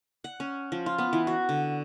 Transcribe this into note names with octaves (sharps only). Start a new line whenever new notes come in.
F#5
C#4
F3
F4
B3
E3
F#4
D3